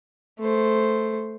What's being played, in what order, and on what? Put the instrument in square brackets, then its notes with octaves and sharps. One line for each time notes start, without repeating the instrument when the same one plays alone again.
[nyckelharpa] A3 C5